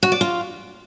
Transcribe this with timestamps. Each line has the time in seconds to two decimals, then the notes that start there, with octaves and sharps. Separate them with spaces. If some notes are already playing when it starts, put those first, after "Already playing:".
0.03 F#4
0.12 D5
0.21 F4